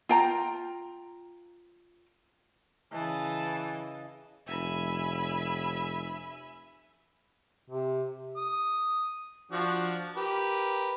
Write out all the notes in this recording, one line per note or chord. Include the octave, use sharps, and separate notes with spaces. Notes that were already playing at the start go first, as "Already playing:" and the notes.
F4 G5 A#5
C#3 E3 D#5 A5
F1 E5 G#5 B5
C3
D#6
F3 D4 F#4
G4 A#4 B4